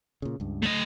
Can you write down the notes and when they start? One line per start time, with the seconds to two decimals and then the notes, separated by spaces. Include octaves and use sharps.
0.22 A#2 C#3
0.40 C#2 G2
0.62 A3 D#5